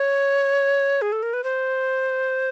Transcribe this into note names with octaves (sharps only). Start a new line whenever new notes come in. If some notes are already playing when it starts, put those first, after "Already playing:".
Already playing: C#5
G#4
A4
A#4
B4
C5